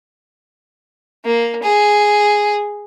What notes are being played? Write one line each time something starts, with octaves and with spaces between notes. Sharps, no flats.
A#3
G#4